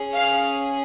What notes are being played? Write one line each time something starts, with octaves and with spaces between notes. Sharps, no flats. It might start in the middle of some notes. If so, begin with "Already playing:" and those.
Already playing: C#4 G#4
F5